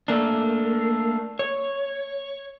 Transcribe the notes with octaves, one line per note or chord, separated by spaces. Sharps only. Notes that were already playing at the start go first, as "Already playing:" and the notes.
A3 A#3 D4
C#5